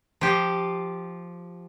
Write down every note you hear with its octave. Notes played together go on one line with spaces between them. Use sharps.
F3 G4